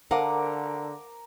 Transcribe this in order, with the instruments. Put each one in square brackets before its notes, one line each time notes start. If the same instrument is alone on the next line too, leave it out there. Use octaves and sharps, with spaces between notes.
[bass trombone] D3 [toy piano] A#4 C5 A5 [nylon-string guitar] F5 F#5 [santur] A#5 D6